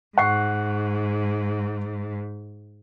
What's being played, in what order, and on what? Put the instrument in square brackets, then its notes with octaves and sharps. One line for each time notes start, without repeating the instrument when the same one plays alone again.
[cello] G#2 [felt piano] F#5 C#6 C7